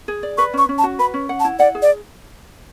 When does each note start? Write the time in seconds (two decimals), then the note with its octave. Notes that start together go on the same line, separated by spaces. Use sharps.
0.08 G#4
0.23 D5
0.38 B4 C#6
0.54 C#4 C#6
0.69 C#4
0.78 A5
0.84 F#4
0.99 B4 B5
1.14 C#4
1.29 F#5
1.40 A5
1.45 E4
1.59 D5 F#5
1.75 G#4
1.82 D5